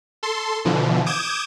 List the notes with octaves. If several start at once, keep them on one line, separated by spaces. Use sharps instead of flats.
A4 C6
B2 D3 E3 F3
D6 D#6 G6 G#6 E7